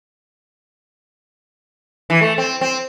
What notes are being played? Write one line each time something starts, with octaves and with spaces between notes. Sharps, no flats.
E3
A3
C4
C4